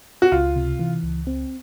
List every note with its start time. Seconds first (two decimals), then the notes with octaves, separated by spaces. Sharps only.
0.22 F#4
0.32 C#2 F4
0.56 C3
0.80 E3
1.03 C#2
1.27 C4